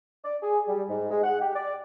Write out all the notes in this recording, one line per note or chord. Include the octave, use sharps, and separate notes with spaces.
D5
G#4
G3
G#2
G#3
F#5
G4
D5